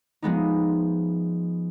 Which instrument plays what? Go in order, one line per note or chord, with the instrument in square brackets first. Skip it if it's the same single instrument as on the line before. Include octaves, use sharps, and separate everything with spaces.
[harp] F3 G#3 B3 D#4